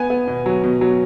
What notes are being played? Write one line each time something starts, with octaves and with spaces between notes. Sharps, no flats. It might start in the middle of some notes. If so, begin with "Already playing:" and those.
Already playing: B3 G#5
B3
B2
F#3
B2
F#3